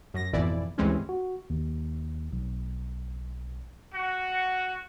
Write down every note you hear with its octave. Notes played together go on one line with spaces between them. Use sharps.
F#2 A#6
G#1 F2 B2 E3 E4 D5
D2 G2 E3 G#3 C4 C#4
F#4
D#2
B1
F#4